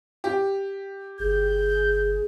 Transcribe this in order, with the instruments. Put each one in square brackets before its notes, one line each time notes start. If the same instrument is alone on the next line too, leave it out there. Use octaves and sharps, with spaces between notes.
[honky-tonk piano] G4
[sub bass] G1 [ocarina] G#4 [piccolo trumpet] G6